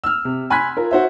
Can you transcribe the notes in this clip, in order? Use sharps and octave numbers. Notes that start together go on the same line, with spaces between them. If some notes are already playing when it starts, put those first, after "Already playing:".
E6 F6
C3
G#5 B5 C6 F#6 G#6 B6
F4 A#4
F#4 C5 E5